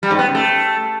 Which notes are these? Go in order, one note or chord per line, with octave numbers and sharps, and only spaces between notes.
G3
G#2
B3
C#3
A3